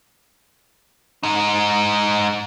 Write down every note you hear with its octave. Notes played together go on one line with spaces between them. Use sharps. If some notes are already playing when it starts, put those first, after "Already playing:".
G#2 D#4